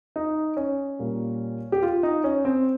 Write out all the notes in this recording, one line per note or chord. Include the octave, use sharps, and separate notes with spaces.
D#4
C#4
A#2 G3 A#3
G4
F4
D#4
C#4
C4